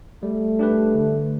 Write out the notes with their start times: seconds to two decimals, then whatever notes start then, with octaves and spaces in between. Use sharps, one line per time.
0.23 G3 A3
0.59 D4 G4 B4
0.95 D3